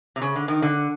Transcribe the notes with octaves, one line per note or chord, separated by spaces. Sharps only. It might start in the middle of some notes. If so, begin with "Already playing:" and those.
C3
C#3
D3
D#3
D3